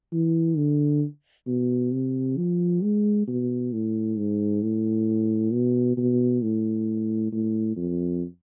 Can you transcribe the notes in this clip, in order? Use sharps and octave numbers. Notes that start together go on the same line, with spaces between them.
E3
D3
B2
C3
F3
G#3
B2
A2
G#2
A2
B2
B2
A2
A2
F2